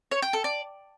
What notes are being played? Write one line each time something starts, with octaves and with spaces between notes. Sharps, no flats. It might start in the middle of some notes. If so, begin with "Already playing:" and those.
C#5
G5
A4
D5